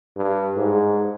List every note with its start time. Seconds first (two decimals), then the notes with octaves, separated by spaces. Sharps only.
0.17 G2
0.56 G#2